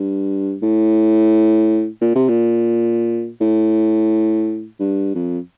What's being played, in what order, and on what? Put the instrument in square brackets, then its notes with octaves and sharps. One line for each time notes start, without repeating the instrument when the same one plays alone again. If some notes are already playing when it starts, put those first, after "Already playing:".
Already playing: [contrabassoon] G2
A2
A#2
C3
A#2
A2
G2
F2